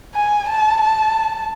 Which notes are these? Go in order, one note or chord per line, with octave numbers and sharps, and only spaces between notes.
G#5
A5
A5